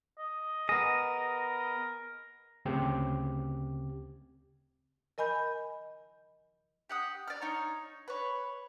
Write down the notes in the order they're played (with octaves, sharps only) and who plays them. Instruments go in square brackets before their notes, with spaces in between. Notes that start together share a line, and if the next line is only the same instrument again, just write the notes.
[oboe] D#5
[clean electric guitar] B3 G#4 [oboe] A#4 [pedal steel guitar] D#5
[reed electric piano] D2 C#3 C4 G4 D6
[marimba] A#4 D#5 G#5 B5 G6
[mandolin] G4 F#5 D#6
D5 F6
D#4 C#5
B4 C#5